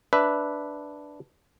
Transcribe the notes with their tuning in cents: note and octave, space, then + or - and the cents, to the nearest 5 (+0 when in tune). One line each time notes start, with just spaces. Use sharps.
D4 -5 B4 +0 E5 +0